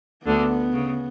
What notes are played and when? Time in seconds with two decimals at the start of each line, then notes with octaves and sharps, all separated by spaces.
0.26 D2 D3 B3
0.73 C#3